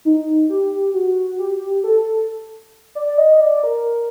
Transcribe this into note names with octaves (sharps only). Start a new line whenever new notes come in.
D#4
G4
F#4
G4
A4
D5
D#5
D5
A#4